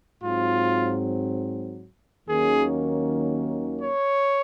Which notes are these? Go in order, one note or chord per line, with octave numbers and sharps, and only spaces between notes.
G#2 F#3 C4 F4
D#2 D#3 F#3 A#3 C#4 G#4
C#5